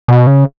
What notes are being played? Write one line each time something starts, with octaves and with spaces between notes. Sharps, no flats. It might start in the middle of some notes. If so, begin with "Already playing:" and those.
B2
C#3